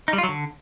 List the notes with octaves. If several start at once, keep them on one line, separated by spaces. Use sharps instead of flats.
D#4
G3
F4
F#3
D3